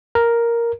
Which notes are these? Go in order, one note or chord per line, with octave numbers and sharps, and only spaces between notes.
A#4